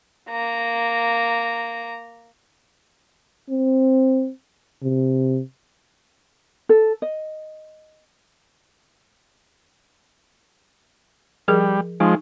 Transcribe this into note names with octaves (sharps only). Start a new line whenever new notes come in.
A#3 A#5
C4
C3
A4
D#5
F3 G3 G#4 A#4
F3 G#3 D#4